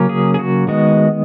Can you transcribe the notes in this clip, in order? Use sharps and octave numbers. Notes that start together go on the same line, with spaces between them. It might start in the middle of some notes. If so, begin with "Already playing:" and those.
Already playing: C#3 F#3 A#3 C#4
G#4
G#4
F#4
D#3 G#3 B3 F#4